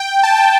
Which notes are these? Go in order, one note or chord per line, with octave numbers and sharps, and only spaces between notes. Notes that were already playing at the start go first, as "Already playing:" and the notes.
Already playing: G5
A5
G5